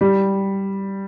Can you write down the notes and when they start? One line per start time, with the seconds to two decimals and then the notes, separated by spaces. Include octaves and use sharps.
0.01 G3